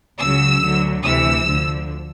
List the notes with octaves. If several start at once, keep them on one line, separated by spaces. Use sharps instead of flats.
C#2 C#3 F#3 E6
D2 D3 F#3
D2 C3 E3 E6
D2 D3 F3